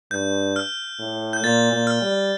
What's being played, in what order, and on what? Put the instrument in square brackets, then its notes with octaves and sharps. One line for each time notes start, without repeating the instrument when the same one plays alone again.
[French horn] G2 [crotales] G6
[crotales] F6
[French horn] A2
[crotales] G6
[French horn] A#2 [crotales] A6
[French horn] A#2
[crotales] F6
[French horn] G3